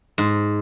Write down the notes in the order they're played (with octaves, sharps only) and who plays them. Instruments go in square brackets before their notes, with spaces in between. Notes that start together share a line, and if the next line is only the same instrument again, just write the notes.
[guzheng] G#2